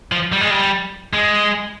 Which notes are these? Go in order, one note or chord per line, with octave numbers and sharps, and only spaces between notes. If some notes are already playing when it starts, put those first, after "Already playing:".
F3
G3
G#3
G3
G#3